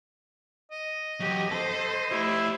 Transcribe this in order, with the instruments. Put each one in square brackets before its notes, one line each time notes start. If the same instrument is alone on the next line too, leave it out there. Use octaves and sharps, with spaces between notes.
[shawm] D#5
[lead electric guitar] E3 F#3 [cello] G4
[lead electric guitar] A4 A5 [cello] C5
[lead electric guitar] A3 G4 [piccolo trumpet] E4